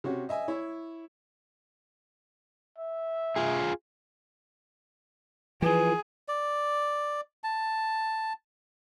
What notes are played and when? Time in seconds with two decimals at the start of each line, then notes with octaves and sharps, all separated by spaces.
0.04 C3 C#4 F#4
0.29 D#5 E5 G#5
0.48 E4 C#5
2.78 E5
3.36 F4 G#4
5.62 E3 F3 G#4 B4
6.28 D5
7.44 A5